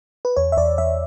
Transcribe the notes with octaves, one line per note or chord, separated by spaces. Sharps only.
B4
E2 C#5
E5
E2 D5
E2 E5